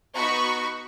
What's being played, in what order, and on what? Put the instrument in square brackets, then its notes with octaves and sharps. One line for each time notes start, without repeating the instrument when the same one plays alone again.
[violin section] B3 D#4 F#4 B5 C#6